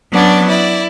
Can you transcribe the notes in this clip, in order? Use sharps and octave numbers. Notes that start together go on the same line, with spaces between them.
F#3 B3 C#4 D4 D5
E4 D5